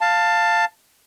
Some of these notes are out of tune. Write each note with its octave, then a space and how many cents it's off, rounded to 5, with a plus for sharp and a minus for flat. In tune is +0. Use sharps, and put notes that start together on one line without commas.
F5 +0 A5 +15